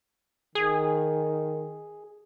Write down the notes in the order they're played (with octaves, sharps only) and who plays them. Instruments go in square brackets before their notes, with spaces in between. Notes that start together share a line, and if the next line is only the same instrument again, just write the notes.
[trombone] D#3 [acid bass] G#4